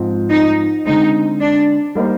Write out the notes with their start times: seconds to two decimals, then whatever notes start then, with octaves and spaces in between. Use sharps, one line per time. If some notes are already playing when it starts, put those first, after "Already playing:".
Already playing: G#2 F3 C4 F4 C5
0.30 D#4
0.85 D3 G#3 C4 D#4
1.40 D4
1.95 G3 A#3 D#4 G4 C5